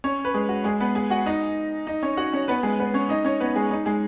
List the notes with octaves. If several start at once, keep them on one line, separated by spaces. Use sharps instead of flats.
C#4 C#5
B4
G#3 G#4
F#4
G#3 G#4
B3 B4
G#4 G#5
F#4 F#5
D#4 D#5
D#4 D#5
C#4 C#5
F#4 F#5
C#4 C#5
B3 B4
G#3 G#4
B3 B4
C#4 C#5
D#4 D#5
C#4 C#5
B3 B4
G#3 G#4
D#4
G#3 G#4